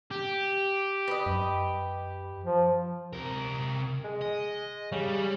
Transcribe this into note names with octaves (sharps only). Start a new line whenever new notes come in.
G4
B4 D#5
F#2
F3
C3 A#4
G#3
D#5
C#3 G3